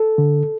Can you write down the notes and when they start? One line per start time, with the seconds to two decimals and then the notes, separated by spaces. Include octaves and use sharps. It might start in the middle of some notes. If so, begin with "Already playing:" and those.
Already playing: A4
0.18 D3